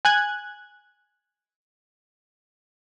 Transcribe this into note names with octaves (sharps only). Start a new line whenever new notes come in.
G#5 F#6 G#6